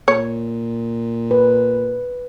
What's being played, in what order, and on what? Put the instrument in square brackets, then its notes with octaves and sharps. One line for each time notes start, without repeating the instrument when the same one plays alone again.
[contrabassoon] A#2 [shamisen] C#5
[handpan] B4